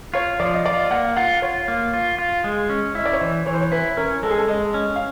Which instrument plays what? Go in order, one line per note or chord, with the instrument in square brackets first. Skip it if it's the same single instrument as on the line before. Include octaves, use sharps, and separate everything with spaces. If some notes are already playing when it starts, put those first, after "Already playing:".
[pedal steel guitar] F4 [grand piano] C#5
[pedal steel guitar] F3 [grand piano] D5
[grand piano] D#5
[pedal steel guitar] F4 [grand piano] D5
[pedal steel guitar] A#3 [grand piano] F#5
[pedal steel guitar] F4 [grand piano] F#5
[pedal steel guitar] F4 [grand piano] C#5
[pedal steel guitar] A#3
F4
F4
G#3
C#4
[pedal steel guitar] E4 [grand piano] D#5
[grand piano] D5
C#5
[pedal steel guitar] E3 [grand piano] C5
[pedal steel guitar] E3 [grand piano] C#5
[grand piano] C5
C#5
[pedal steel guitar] E4 [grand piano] B4
[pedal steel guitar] C#4 [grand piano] A#4
[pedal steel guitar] G#3 [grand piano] A4
[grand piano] G#4
A4
[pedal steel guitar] G#3 [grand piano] D#5
[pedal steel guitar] C#4
[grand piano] F5